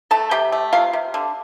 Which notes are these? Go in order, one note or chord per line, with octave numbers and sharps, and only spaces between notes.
A3 A4 A5
C3 G4 G5
A3
C3 F4 F5
C3
D3